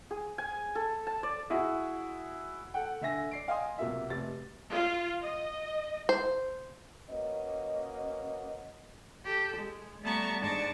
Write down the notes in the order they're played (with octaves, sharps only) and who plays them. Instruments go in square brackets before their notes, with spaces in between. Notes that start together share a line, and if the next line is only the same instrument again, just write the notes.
[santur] G#4
G#5
A4
A5
D5
[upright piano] E4 F#4 G#4
A4 F#5 G5
D3 E5 G#5 A#6
D5 C7 D7
D#5 F5 G5 G#5 C6 D#6
B1 C3 A#3 F4 E5
F1 C3 A6
[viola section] F4
D#5
[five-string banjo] C5
[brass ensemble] A#3 C#4 F#4 B4 D#5
[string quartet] G4 A4
G#3
G3 A3 B3 A5 A#5 C#6
G#2 D4 A5 C#6 A#6